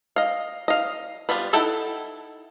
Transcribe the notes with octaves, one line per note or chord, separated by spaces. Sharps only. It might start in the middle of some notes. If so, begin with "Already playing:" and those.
D#5 F5
D#5 F5
G3 B3 F4 B4
D#4 E4 A4 F#5 G5